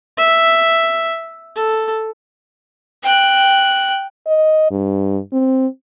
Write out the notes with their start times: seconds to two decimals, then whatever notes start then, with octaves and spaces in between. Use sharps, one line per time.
0.17 E5
1.56 A4
3.03 G5 F#6
4.27 D#5
4.71 G2
5.32 C4